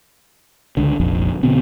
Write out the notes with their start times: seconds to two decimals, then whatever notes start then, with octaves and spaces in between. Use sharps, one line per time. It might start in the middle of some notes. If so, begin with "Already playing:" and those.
0.77 C#2 D3
1.00 F1 A#1 F2
1.43 B2 D3 B3 C4